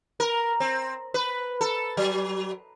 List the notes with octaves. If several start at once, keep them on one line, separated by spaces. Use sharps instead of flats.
A#4
C4
B4
A4
F#3